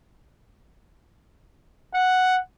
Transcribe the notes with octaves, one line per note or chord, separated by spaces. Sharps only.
F#5